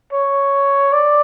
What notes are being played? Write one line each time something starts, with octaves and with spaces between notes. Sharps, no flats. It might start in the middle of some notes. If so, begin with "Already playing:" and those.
C#5
D5